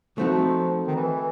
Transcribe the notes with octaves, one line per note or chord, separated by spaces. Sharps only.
F3 A3 C4 D#4 F#4
D#3
E3